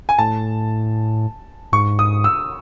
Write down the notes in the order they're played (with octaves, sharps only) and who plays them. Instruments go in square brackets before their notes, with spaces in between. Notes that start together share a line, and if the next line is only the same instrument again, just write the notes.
[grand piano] G#5
[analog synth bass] A2 [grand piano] A5
[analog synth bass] G#2 [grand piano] C#6
[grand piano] D#6
E6